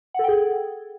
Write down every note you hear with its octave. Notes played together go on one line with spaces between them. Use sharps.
G#4 A4 F#5 G5